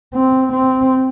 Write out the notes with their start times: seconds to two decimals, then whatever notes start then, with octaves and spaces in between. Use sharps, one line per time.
0.14 C4
0.53 C4